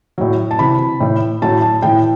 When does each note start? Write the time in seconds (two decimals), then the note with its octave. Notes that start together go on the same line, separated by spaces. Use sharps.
0.18 A2 F#3
0.51 A5
0.58 C3 E3 B5
1.01 A2 E3
1.42 A2 F#3 A5
1.62 A5
1.82 A2 E3 G5